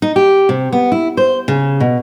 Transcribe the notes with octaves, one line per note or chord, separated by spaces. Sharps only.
D#4
G4
C3
B3
E4
C5
C#3
B2